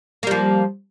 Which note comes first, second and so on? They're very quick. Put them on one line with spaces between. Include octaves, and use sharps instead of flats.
A#3 G3 F3